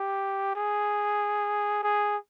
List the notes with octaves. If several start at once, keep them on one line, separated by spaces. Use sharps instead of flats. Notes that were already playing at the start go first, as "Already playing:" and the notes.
Already playing: G4
G#4
G#4